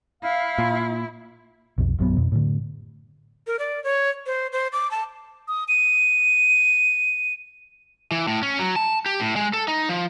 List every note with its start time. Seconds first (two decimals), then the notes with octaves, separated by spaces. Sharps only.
0.23 E4 F5
0.58 A#2
1.78 B1 F2
1.98 A#1 F#2 F#3 B3
2.17 F2 B2
2.32 A2 D3
3.47 A#4
3.59 D5
3.84 C#5
4.26 C5
4.53 C5
4.73 D6
4.91 A5
5.48 D#6
5.68 D#7
8.11 E3
8.28 A2
8.43 C#4
8.59 F#3
8.76 A5
9.06 G4
9.20 A2
9.36 G#3
9.53 A4
9.68 D#4
9.89 F3